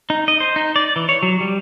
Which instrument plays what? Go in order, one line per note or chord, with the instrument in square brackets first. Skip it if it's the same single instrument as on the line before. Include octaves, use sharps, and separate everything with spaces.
[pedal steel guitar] D#4
D#5
C5
D#4
D5
E3
C#5
F#3
G3